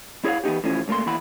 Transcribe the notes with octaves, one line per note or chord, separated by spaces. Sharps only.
E4 G#4 C#5 D5 F5 F#5
E3 B3 D#4 G4
A2 E3 F3 C#4
C#2 A3 A#3 A4 C6
D#2 B2 E3 E4 F#5 B5